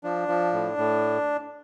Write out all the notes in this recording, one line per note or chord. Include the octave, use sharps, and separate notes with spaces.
F3 D4
F3
A2
A2